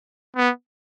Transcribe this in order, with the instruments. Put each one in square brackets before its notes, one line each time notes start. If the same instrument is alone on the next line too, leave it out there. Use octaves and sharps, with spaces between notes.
[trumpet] B3